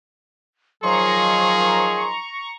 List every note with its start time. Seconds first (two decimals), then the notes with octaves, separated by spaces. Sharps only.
0.83 D#3 F3 F#3 G#4 A#5 C6 C#6